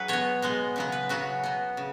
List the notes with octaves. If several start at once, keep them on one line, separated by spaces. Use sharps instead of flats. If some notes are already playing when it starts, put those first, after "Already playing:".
Already playing: F#3 F#4 G#4 B4
B2 B3 C#5
B2 G#3 B3
C#3 F#3 B3
B4
C#3 F#3 B3 F#4
B2 B3
C#3